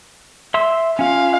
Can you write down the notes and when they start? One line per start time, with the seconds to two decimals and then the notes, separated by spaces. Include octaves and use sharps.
0.54 E5 C6 E6
0.99 C#4 F4 F5